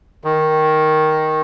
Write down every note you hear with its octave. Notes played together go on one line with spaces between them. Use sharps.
D#3